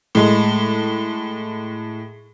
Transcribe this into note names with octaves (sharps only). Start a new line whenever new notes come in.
A2 G#3